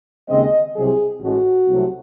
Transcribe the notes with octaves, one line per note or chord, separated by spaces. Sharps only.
D#2 C#3 G#3 C4 D#5
C2 C3 F#3 C4 G#4
A1 A2 G#3 F#4
C2 C3 F#3 A3